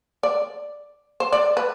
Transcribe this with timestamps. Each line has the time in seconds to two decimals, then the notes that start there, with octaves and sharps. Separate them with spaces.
0.23 D5
1.20 C5
1.32 D5
1.57 B4